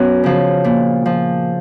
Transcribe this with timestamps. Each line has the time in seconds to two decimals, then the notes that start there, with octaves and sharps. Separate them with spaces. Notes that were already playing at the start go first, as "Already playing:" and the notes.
Already playing: F#2 B3 C#4
0.24 C#3 F3
0.64 A#2
1.06 F3